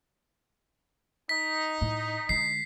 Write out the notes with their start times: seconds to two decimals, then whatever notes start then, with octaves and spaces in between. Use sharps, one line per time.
1.29 D#4 B6
1.81 A2
2.29 D3 G#3 C7